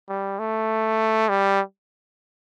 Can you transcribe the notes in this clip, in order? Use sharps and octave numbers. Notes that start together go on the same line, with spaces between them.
G3
A3
G3